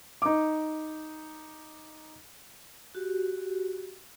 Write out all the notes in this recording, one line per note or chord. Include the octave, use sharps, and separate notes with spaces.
D#4 D6
F#4 G4